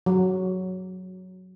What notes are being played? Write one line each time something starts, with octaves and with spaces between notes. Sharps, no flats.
F#3